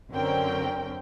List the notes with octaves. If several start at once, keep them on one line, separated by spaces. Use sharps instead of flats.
F#2 D3 C4 C#4 A#4 G5